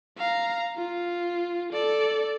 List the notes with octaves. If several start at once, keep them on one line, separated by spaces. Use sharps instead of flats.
F5 A#5
F4
A4 D5